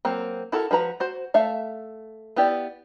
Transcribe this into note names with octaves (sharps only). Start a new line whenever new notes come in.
F#3 A#3 C4
E4 F#4 A4 A#4
F3 F#4 B4 A#5
F#4 C5
A3 E5 F5
B3 E4 G4 D5